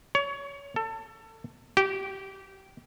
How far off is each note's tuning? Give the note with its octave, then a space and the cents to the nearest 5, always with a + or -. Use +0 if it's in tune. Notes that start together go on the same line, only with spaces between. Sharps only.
C#5 +25
A4 +25
G4 -20